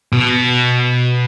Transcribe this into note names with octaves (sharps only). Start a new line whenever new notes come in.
B2